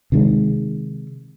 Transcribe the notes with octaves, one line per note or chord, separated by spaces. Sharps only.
C3 D#3 G#3